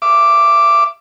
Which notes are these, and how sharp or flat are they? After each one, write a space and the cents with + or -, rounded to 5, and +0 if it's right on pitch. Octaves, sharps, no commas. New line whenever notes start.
E5 +30 D6 +0